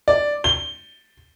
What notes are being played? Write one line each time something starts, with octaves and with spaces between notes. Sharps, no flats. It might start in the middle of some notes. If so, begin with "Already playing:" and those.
D5
G7